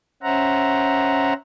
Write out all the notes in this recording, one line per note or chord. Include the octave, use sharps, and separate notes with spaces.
C#4 C5 E5 F#5 A#5